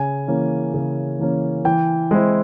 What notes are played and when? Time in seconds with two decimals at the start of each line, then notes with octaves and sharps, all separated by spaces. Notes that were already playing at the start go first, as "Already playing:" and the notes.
Already playing: C#3 G#5
0.28 E3 A#3 C#4
0.74 C#3
1.19 E3 A#3 C#4
1.65 E3 G5
2.11 G#3 C4 E4